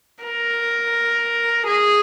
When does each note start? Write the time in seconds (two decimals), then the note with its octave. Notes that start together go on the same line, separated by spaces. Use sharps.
0.24 A#4
1.67 G#4